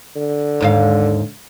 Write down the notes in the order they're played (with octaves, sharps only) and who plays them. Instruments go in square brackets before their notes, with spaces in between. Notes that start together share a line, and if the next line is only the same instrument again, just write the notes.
[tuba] D3
[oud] D#2 G#2 F5